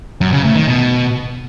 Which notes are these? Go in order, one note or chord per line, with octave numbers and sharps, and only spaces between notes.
F#2
C#3
A2
D#3
B2